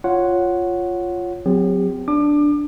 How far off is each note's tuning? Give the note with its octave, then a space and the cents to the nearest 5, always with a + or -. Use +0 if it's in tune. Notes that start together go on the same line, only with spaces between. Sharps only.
F4 +0 C#5 +0 F#5 +0
F#3 -10 C4 -35 G4 +45
D4 +0 D6 +30